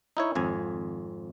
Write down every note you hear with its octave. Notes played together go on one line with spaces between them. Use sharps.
D#4 E4 C#5
G#1 F2 G#5